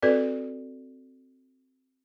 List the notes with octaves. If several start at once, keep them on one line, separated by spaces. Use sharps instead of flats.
C4 F#4 A4 B4 D5